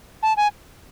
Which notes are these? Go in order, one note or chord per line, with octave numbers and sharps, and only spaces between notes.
A5
G#5